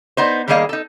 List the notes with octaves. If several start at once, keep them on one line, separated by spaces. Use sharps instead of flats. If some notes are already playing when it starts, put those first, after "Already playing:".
B3 D#4 C5
D#3 G3 A#3 G#4 D#5 F5
D#4 A4